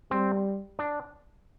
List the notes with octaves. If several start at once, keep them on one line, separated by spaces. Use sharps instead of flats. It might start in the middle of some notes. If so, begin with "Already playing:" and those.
G3 C4
D4